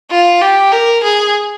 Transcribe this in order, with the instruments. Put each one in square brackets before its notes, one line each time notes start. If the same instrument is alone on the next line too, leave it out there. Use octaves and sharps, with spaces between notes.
[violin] F4
G4
A#4
G#4